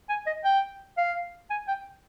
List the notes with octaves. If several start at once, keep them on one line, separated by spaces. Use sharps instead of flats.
G#5
D#5
G5
F5
G#5
G5